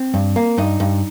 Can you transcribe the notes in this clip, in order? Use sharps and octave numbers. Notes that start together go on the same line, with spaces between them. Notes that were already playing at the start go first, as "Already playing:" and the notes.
Already playing: C4
G2
A#3
G2 D#4
G2